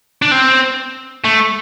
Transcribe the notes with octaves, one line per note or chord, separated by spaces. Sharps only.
D4
C4
A3